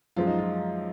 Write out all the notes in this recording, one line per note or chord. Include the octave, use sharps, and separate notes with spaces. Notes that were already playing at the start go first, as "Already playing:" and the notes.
F#2 F3 G#3 F4
D#4
F4